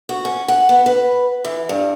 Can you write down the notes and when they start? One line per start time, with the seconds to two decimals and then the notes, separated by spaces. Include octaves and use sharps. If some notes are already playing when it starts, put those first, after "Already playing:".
0.09 F#4
0.25 C#4
0.48 F#5
0.69 B3
0.86 B4
1.45 E3
1.69 G2